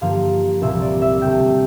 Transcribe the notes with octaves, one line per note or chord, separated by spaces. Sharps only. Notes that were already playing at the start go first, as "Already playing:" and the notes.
G2 D3 F3 A#3 F5
C2 A#2 F3 A#3 E5
D5
E5
D2 C3 G3 G5